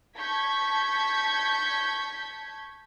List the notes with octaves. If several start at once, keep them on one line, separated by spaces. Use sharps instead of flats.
A5 C#6 G6 G#6 B6